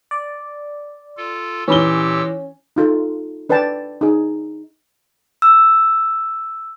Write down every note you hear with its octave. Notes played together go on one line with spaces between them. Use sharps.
D5
F4 A4
A#2 E3 C#4 G4 B4 B5 E6 G7
D#4 F4 A4
D4 B4 D5 G5 A5
D#4 G#4
E6